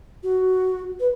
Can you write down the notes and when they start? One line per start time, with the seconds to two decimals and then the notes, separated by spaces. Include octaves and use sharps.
0.23 F#4
1.00 B4